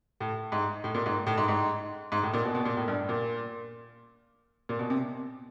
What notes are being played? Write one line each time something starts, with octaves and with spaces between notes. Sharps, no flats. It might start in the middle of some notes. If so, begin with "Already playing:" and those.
A2
G#2
A2
A#2
G#2
A2
G#2
G#2
G#2
A2
A#2
B2
B2
A#2
A2
G2
A#2
A#2
B2
C3